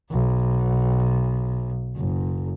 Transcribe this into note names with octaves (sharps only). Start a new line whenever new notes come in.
B1
F#1